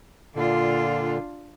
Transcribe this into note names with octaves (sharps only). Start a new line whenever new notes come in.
A#2 D3 D4 F4